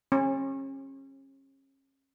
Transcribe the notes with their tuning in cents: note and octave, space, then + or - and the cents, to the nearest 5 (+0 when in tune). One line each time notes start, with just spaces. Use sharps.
C#4 -35